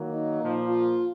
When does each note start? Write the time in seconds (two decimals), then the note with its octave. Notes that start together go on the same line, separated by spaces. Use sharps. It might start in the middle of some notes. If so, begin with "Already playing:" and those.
Already playing: D#3 F#3 A#3
0.10 D#4
0.39 A#2 F3 A#3
0.67 F4